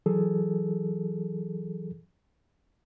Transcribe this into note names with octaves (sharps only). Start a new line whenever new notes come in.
E3 F#3 G#4 A4